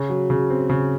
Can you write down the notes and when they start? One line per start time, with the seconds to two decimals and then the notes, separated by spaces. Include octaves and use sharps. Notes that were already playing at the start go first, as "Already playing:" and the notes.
Already playing: C#3
0.09 F#3
0.30 C#3
0.50 C4
0.69 C#3